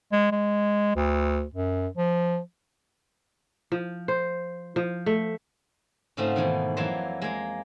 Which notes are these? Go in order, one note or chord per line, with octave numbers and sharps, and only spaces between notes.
G#3
G#3
D2
F#2
F3
F3
C5
F3
A3
G#2 C#3 A3 C4 F4 F#4
B2 D#3 E3
F2 E3 F#3 A#3 A5 C6
G#3 A#3